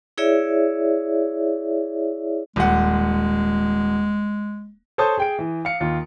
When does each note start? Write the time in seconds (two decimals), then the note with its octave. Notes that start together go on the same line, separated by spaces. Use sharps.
0.18 E4 G#4 C#5 D5 E5
2.56 D#1 G#3 F#5
4.98 A4 C5 C#5 A5 D#6 G6
5.18 G#4 G5 D7
5.39 E3
5.65 F5 C#7
5.80 D#2 F4